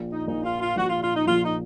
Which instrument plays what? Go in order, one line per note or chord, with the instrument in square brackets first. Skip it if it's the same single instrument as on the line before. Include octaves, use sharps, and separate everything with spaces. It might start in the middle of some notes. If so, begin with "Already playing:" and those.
Already playing: [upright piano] A#1 A#2 F3
[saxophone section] D#4
[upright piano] A#1 A#2 F3 [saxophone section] D#4
[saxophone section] F4
F4
[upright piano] A#1 A#2 F3 [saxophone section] F#4
[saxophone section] F4
F4
D#4
[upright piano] A#1 A#2 F3 [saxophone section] F4
[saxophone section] D#4